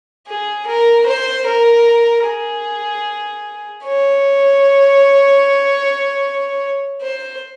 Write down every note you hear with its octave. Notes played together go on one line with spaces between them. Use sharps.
G#4
A#4
C5
A#4
G#4
C#5
C5